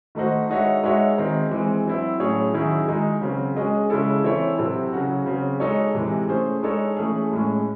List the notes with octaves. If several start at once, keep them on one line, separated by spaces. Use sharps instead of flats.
D#3 A3 D#4 F#4 C5
G#3 D#4 F#4 C#5 E5
G#3 D#4 F#4 C#5 E5
D#3 G#3 C4 D#4
E3 G#3 C4
F#3 C4 E4
A2 F#3 C#4 G#4 C#5
D#3 F#3 C#4 E4 G#4
D#3 G#3 D#4 G#4
C#3 F#3 C4
G#3 C#4 G#4 D#5
C#3 G#3 C#4 E4 A4
E3 C4 E4 A4 C#5
C3 F#3 C4 E4 A4
C#3 F#3 C#4 F#4
C#3 F#3 C4
G#3 D#4 A4 C#5
C3 E3 G#3
A3 C#4 G#4 C5
G#3 D#4 A4 C#5
E3 A3 C#4 G#4
A2 G#3 C#4